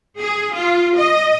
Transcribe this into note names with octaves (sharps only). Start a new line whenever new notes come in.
G#4
F4
D#5